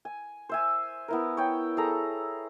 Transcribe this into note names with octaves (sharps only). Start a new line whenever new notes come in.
G#5
C5 E5 G#5
B3 E4 A#4
C#5 G5
G#4 A4 A#5